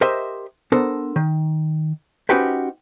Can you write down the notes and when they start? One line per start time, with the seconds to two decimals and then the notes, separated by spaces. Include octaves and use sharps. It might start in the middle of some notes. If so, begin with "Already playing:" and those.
0.01 G4 A#4 C5 D#5 E5
0.72 B3 D4 A4 A#4 C5
1.16 D#3
2.29 C#4 D#4 F#4 G4 B4 C5